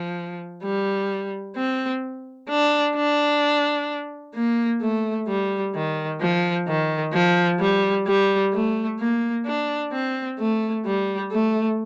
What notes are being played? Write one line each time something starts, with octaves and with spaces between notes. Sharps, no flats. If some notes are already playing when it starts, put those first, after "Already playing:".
Already playing: F3
G3
C4
D4
D4
A#3
A3
G3
D#3
F3
D#3
F3
G3
G3
A3
A#3
D4
C4
A3
G3
A3